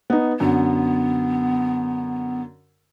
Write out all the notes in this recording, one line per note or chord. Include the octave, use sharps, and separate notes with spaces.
B3 D#4
F#2 D3 B3